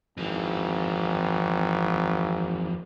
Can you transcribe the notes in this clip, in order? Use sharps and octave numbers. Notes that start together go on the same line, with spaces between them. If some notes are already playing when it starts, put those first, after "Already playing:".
G#1 F2 E3